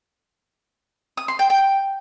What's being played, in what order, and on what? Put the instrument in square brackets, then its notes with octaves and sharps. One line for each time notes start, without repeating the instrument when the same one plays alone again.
[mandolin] D#6
C6
G5
G5